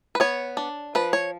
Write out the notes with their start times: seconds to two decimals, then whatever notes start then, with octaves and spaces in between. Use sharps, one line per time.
0.15 B4
0.20 B3 C#5
0.57 D4
0.95 F3 B4
1.13 C#5